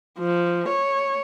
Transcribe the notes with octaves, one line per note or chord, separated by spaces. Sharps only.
F3
C#5